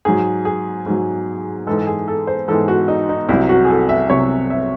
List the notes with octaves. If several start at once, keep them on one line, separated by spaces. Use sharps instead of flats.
G#2 F#3 G#4
G#4
G#2 F#3
G#2 E3 G#3 A4
A4
G#4
A4
C5
G#2 E3 G#3 A4
F#4
D#4
D#4
C2 C3 F#3 E4
F#4
G#4
A4
E5
C2 C3 F#3 C#5
E5